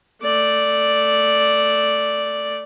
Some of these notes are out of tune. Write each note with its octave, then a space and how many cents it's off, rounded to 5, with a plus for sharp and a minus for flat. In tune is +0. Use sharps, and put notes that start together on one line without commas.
A3 +5 D5 +0